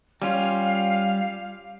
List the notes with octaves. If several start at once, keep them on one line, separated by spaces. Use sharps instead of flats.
G3 C#4 F4 F5